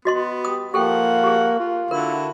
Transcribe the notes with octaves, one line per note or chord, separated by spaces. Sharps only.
B3 F#4 D#5 C6
G4 D#6
F3 A#3 G4 A4 F#5 G5
G4 G#4
F4
D3 E4 F#4 A#4